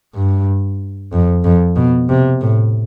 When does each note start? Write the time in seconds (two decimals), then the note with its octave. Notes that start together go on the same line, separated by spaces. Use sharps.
0.15 G2
1.13 F2
1.44 F2
1.76 B2
2.09 C3
2.41 A2